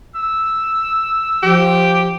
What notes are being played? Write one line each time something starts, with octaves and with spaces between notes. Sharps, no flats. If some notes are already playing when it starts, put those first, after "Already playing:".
E6
F3 G4